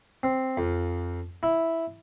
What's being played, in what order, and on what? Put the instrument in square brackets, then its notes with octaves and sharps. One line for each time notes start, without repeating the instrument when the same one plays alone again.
[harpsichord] C4
F2
E4